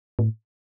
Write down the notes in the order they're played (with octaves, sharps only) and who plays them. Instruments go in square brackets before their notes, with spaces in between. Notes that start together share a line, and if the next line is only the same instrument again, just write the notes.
[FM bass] A2